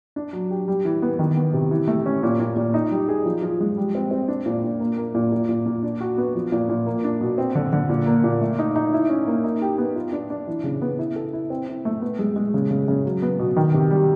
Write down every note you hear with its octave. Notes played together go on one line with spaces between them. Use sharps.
D4
F#3
G4
G3
E3
B3
D#3
B3
C3
E3
A3
C#4
A#2
A#2
A#2
D#4
G3
G#4
F3
F3
G#3
G3
C4
C4
D4
A#2
D4
A#3
A#3
A#2
A#2
A#2
A#2
D4
F#4
B3
F3
A#2
A#2
A#3
D4
B2
C4
D3
D3
A#2
A#3
A#2
A3
D#4
D#4
E4
C#4
A#3
D#4
G4
B3
F4
D4
D4
E3
C#3
B3
E4
A4
E4
C4
E4
A3
B3
G#3
G#3
C#3
C#3
C#3
F#3
B3
B2
D#3
C3
G3